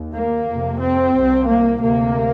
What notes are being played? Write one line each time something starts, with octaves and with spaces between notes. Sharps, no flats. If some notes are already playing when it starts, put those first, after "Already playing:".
Already playing: D#2
A#3
F2 C3
C4
C2 C3
A#3
D2 C3 A#3